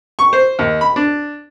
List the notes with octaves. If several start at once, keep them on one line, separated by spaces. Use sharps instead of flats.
C#6
C5
D#2
B5
D4